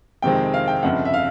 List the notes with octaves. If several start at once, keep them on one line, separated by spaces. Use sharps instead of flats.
F2 C3 D#3 G#3 C4 G5
F5
G5
G1 F2 C#3 F#5
E5
F5